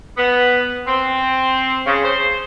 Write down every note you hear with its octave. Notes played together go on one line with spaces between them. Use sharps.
B3
C4
C#3
C5